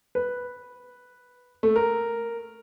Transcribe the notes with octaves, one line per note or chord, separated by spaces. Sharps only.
B4
A3
A#4